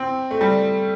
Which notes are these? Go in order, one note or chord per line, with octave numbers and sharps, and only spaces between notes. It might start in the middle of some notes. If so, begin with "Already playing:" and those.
Already playing: C4
A3
G3